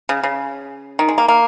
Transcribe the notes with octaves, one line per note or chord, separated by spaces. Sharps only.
C#3
C#3
D#3
G#3
A#3
A#3